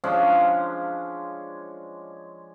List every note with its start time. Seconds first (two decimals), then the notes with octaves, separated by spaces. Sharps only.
0.04 F3 G#3 C#4 D4